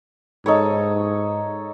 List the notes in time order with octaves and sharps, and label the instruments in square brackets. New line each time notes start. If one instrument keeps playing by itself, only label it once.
[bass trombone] G#2 [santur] D#4 A4 C#5